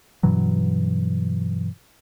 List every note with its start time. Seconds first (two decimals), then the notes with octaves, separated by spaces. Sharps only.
0.23 G2 B2 E3 F#3